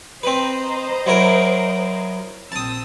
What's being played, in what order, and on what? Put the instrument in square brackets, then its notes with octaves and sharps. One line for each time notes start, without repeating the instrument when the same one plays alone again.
[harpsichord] C4 B4 [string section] C5 D#5 A#5
[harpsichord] F#3 E4 A#4
[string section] A#1 C4 E6 [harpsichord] A5 D#6